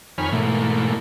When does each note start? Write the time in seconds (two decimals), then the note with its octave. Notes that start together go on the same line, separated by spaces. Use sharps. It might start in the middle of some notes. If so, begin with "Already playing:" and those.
0.18 F2 D#3 C#5 G#5 B5 F6
0.32 G#2 B2 E3 A3 A#3